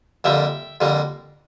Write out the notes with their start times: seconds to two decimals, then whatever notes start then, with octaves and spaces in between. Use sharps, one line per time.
0.24 F2 D3 G3 A#3 E5 G5
0.81 F2 D3 G3 A#3